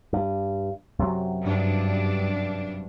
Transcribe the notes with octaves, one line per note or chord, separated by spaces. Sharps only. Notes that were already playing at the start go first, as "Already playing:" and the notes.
G2
F#2 C3 F#3
G2 D4